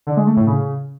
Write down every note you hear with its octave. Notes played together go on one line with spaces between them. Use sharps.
D3
G#3
A3
A2
C#3